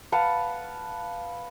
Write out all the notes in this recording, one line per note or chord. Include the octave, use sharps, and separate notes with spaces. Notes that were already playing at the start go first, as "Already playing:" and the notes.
B4 F5 F#5 A5